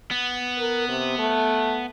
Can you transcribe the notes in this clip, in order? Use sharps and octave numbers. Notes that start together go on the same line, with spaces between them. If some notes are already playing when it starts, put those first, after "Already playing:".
B3
A#4
C3
A3